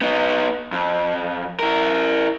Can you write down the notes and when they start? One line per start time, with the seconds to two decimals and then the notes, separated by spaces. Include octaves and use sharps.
0.01 B3 D#4
0.72 F2
1.59 E4 A#4